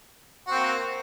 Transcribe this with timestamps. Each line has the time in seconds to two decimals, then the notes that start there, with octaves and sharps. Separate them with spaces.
0.47 F#4
0.50 C4
0.53 A#3